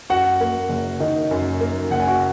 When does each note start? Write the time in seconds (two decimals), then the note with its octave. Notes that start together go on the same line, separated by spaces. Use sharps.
0.10 F#2 F#4 F#5
0.41 A#3
0.70 F#1
1.00 D#3 D#4 D#5
1.31 F#2
1.61 A#3
1.91 F#1 F#5
2.00 G#5
2.08 F#4 F#5